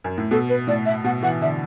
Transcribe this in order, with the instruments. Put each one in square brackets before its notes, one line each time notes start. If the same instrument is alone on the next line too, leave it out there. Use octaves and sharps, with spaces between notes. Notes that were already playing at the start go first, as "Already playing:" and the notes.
[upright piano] F#2
A2
[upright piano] B2 [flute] A4
[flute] B4
[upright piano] A2 [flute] D5
[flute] E5
[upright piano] B2 [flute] F#5
[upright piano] E3 [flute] F#5
[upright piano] D3 [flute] E5